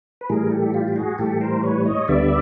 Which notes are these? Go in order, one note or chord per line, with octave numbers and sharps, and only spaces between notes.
B4
A2 E3 G3 G#4 A#4
G4 A4
F4 G4
G4
F#4 G#4
A2 E3 G3 G4 A4
A#4 C5
B4 C#5
C#5 D#5
D2 D3 G3 B3 D5 E5